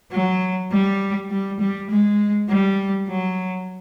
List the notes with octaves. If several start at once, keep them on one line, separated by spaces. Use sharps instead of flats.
F#3
G3
G3
G3
G#3
G3
F#3